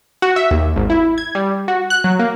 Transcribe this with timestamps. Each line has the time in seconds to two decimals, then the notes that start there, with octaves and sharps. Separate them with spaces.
0.22 F#4
0.36 E5
0.51 D#2
0.76 G#1
0.90 E4
1.18 G#6
1.35 G3
1.68 F#4
1.90 F#6
2.04 F#3
2.19 A#3